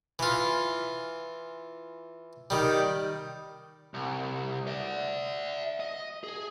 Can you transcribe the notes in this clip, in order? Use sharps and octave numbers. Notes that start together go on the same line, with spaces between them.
E3 F4
D#3 G3
C2
D5 E5
D#5
G#4